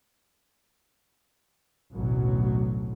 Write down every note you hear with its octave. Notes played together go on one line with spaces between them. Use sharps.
A1 D2 B2 F#3